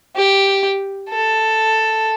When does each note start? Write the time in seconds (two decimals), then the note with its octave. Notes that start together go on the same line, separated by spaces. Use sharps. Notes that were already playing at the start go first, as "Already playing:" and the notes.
0.16 G4
1.10 A4